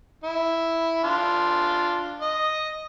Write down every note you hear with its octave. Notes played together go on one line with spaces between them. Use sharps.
E4
D4 F4
D#5